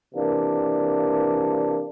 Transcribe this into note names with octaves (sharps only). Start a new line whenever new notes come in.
C3 E3 A#3 D4